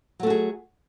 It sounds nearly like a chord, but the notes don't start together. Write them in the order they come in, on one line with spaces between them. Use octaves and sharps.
F#3 A3 F#4 G#4